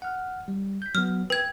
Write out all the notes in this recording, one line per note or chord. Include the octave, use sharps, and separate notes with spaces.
F#5 F6
G3
G6 B6
F#3 B3 F6
B4 G5 G#6